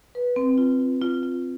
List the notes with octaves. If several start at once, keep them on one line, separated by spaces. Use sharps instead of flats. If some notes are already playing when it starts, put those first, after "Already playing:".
B4
C4
F4
F4
F4
F4